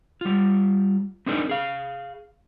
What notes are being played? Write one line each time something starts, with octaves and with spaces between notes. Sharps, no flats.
G3 F4
C4 D4 D#4 G#4 A#4 D5
G#4 F5